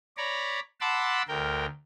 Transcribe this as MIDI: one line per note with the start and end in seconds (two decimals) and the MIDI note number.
0.17 0.60 73
0.17 0.60 74
0.17 0.60 82
0.17 0.60 83
0.81 1.22 78
0.81 1.22 81
0.81 1.22 83
0.81 1.22 84
0.81 1.22 86
0.81 1.22 88
1.28 1.66 38
1.28 1.66 70
1.28 1.66 79